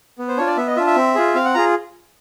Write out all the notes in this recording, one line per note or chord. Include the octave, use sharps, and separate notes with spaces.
B3
C5
D4 F4 C#5
D5
B3 E5
D#5
D4 F4 E5
E5
C4
F4 G#4
C4 F5
F#5
F4 G#4 A#5